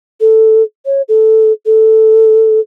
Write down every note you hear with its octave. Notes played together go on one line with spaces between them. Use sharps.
A4
C#5
A4
A4